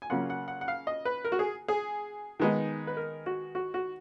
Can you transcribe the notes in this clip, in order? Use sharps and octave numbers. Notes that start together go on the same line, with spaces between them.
G#5
C#3 F#3 A#3 C#4 F4 F#5
F#5
F#5
F#5
F5
D#5
B4
A#4
F#4
G#4
G#4
D#3 G#3 B3 D#4
B4
A#4
F#4
F#4
F#4